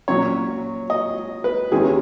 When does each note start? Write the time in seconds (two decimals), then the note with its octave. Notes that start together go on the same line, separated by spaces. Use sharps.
0.08 A#2 F#3 C#4 C#5
0.90 D#5
1.44 B4
1.72 D#2 D#3 G#3 C#4 E4 G#4